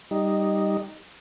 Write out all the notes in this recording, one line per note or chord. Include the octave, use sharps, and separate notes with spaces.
G3 D#4